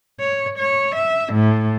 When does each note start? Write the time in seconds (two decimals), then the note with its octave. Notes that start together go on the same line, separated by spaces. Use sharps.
0.20 C#5
0.58 C#5
0.95 E5
1.33 A2